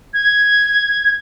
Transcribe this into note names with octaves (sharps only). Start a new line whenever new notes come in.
G#6